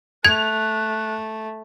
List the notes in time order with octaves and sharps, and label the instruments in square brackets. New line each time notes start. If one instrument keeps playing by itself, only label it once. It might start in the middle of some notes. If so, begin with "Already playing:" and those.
[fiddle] A3 [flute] F#6 [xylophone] G#6 [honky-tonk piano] F7